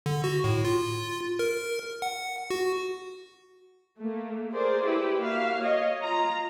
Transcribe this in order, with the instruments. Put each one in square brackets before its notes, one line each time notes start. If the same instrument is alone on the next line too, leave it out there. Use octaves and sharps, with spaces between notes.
[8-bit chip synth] D3
F#4
A2
F4
A#4
F#5
F#4
[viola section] A3 A#3
G#4 A#4 C5 D5
E4 G4 B4
A#3 F#4 E5 F5
C#5 D#5
F4 A#5